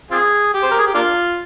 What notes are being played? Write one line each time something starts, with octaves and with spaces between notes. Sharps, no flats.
C4 F4 G#4
G4
C5
A#4
G#4
G4
A#3 D4 F4